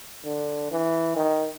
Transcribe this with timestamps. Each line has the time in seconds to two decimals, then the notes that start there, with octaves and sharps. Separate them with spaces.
0.25 D3
0.71 E3
1.16 D#3